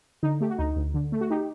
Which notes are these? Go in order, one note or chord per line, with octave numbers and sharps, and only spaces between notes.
D3 D#4
A3 G4
F#4
D2 D#4
D2
D3
A3
F#4
D#4 G4